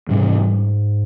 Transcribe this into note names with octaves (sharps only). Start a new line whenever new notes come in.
G#2 C3 E3 G3 C#4